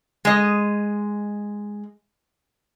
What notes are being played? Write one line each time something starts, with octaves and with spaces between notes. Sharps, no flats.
G#3 D#5